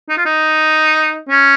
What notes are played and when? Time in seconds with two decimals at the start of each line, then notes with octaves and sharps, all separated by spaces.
0.09 D#4
0.17 F4
0.26 D#4
1.29 C#4